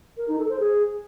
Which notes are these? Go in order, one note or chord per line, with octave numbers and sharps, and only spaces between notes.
A#4
D#4
A4
C5
G#4